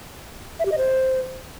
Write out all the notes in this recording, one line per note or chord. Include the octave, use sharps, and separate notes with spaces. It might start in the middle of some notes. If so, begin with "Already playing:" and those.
E5
G4
D#5
C5